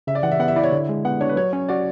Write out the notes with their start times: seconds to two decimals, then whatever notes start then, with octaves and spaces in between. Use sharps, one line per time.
0.07 C#3 E5
0.15 D5
0.23 E3 F#5
0.31 E5
0.39 B3 F#5
0.48 E5
0.56 E4 D5
0.64 C#5
0.72 D3
0.89 G#3
1.05 B3 F#5
1.21 D4 C#5
1.29 B4
1.36 F#3 C#5
1.53 C#4
1.68 F#4 D5